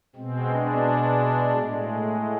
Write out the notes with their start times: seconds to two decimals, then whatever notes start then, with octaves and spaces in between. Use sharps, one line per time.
0.16 B2 G#3 C4
0.50 D4
1.53 A2 G#3